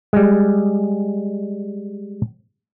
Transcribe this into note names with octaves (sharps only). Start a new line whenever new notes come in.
G3 G#3